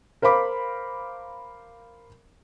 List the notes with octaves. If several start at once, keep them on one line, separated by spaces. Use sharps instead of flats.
A#4 C5 F5 B5 D6